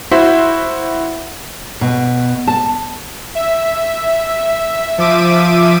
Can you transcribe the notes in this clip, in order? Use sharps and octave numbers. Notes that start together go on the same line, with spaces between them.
E4 F#4 C5 E5
B2
A5
E5
F3 E5 D6 D#7